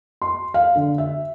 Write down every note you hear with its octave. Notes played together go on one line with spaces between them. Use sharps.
C6
F5
D3
E5